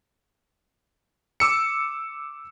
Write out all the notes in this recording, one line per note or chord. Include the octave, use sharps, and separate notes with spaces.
D6 E6 C#7